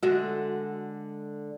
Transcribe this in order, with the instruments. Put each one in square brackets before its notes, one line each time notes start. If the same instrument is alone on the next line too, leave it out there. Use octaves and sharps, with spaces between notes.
[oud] D3 G#3 E5 [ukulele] F#4